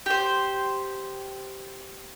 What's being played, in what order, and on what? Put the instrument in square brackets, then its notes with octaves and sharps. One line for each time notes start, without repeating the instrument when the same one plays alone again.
[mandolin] G4 C5